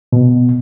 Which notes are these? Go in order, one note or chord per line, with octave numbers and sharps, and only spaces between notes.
B2